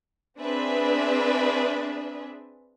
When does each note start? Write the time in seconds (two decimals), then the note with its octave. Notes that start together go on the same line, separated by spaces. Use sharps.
0.38 C4 D4 G#4 B4 E5